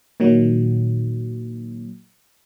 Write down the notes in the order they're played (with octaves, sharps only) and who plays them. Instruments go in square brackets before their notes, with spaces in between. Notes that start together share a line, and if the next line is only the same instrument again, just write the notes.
[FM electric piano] A#2 D#3 F#3